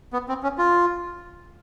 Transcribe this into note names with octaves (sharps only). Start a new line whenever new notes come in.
B3
C4
C#4
F4